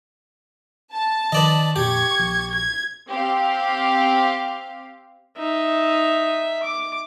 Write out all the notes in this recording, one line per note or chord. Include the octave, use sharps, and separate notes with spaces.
A5
D#3 B4 D5 D#5
F2 A#2 G4 C#6 G#6
A#1
G#6
C4 G4 F5
D#4 E5
D6